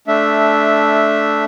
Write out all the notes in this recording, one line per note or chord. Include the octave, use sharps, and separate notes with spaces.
A3 D4 E5